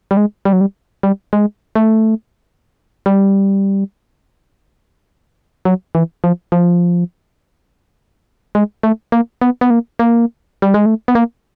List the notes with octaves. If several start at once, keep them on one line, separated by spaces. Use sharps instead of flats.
G3
G#3
G3
F#3
G3
G3
G#3
A3
G3
F#3
E3
F3
F3
G#3
A3
A#3
B3
B3
A#3
A#3
G3
G#3
A3
B3
A#3